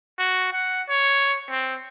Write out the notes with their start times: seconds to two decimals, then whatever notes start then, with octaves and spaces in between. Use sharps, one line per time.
0.18 F#4
0.53 F#5
0.89 C#5
1.50 C4